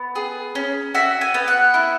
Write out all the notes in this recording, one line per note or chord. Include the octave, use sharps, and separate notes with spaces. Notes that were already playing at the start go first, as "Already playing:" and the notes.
Already playing: B3
G#4
C#4
F#4 E5
G#5
B3
F#5
E4